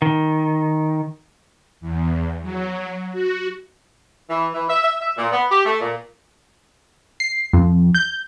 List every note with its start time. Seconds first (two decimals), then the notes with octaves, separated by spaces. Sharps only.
0.02 D#3
1.81 E2
2.42 F#3
3.12 F#4
4.29 E3
4.54 E3
4.69 E5
4.82 E5
5.00 E5
5.17 A#2
5.32 B3
5.50 G4
5.65 A3
5.81 A#2
7.20 C7
7.53 F2
7.95 G6